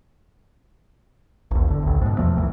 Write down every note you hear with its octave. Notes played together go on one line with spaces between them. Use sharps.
A1 D#2
G1 D3
A1 D2
G#2 B2
E2 F3 A3
D1 C2 D3 E3